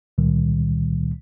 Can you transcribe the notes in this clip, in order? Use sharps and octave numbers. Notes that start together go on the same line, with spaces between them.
C#2 A#2 D#3 G3